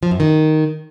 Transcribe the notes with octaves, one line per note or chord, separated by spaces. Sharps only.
F3
F#2
D#3